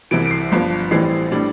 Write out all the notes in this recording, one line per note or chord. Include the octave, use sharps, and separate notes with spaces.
C2 C3 E3 D7
D7
C7
G1 G2 F3 C7
A1 A2 E3 G3 C4 C7
A2 G3 D4